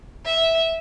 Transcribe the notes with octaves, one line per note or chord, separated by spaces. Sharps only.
E5